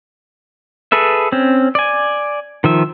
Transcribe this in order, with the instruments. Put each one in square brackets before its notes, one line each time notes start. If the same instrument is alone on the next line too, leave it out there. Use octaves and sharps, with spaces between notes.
[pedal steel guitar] G#4 A4 B4 E5
C4 C#4
D5 G#5
D#3 F3 E5